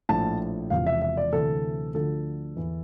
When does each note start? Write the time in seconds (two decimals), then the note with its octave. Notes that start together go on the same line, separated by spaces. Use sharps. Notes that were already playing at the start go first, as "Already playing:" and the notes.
0.09 A#1 A2 F3 A5
0.70 E1 E2 C3 F3 F5
0.87 E5
1.02 E5
1.17 D5
1.32 D2 C3 E3 A4
1.94 D2 D3 F3 A4
2.57 E2 E3